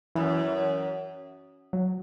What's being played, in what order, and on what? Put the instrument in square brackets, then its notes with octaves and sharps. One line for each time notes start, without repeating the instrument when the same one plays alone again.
[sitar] F#2 [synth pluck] E3
[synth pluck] F#3